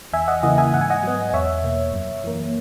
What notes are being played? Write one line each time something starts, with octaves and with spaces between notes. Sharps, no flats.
E2 E5 G#5
D#5 F#5
C#3 E3 A#3 D#5 F#5
E5 G#5
G#2 F#5
G#5
D#5 F#5
F#3 B3
D#5
E2 C#5 E5
B2 A#3
F#2
E3 A#3